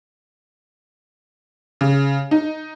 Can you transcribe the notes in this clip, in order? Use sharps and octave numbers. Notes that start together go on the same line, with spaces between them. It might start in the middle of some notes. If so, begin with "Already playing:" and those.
C#3
D#4